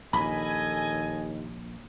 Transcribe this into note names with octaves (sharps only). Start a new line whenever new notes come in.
A#1 D#2 A4 D#5 G#5 B5